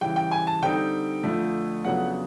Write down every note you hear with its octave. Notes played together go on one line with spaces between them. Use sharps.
C#3 E3 G3 G5
G5
G#5
A5
D3 G3 C4 D#4 G5
F2 D3 F3 A3
F2 C#3 F#3 B3 D4 F#5